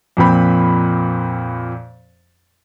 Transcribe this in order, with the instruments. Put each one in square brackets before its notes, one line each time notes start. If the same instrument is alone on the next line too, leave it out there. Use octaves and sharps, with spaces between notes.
[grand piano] F2 A#2 C4 B5